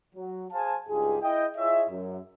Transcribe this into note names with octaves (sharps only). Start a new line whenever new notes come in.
F#3
G#4 C5 F5 G#5 A5
C#2 G2 D#4 F4 G4 G#4
E4 D#5 G5
E4 F4 G#4 C#5 D#5 E5
F#2